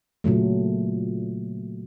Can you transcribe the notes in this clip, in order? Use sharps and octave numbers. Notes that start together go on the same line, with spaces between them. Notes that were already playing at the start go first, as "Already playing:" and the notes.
A#2 C#3 F#3 A3